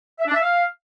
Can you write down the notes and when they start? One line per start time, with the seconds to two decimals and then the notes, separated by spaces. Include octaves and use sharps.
0.19 E5
0.27 D4
0.34 E5
0.42 F5